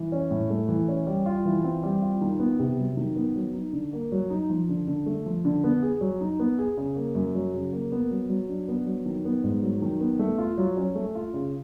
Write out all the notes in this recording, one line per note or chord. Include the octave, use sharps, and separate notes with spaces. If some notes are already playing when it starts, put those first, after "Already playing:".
Already playing: E3
C#4
A2
A3
E3
C#4
G3
F4
E3
C4
G3
F4
D#3
B3
C3
F#3
D#3
B3
F#3
D#4
D3
A#3
F#3
D#4
F3
D3
D3
A3
F3
D3
B3
G#4
F#3
D#4
B3
G#4
C#3
A#3
F#2
F#3
C#3
A#3
B3
F#3
F#3
D4
B3
F#3
D#3
B3
G#2
F#3
D#3
B3
A3
F4
F#3
C#4
A3
F4
C#3